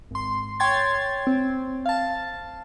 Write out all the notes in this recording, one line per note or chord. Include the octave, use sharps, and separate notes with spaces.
G#1 C6
C#5 G5 C6 G#6 A6
C4
F5 A5